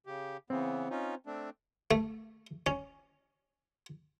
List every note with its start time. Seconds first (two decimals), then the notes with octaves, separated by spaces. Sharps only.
0.06 C#3 G4
0.50 C#3 E3 B3 C4
0.90 C#4 D#4 F4
1.26 A3 C4 D4
1.91 A3
2.67 C#4